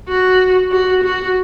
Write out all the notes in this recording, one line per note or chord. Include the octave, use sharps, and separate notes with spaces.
F#4
F#4
F#4